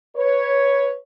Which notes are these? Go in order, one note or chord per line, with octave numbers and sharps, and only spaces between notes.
B4 C#5